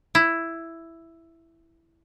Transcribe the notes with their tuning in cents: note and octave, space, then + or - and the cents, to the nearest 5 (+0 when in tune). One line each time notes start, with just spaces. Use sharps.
E4 +5